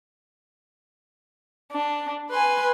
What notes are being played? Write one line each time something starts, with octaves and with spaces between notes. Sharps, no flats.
D4
B4 G#5 C6